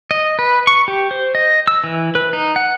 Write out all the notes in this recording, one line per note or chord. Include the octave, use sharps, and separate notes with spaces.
D#5
B4
C#6
G4
C5
D#5
E6
E3
B4
D#4
F#5